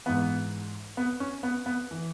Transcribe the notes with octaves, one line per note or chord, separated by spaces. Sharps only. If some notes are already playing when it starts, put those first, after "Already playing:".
G#2 E3 B3
B3
C#4
B3
B3
E3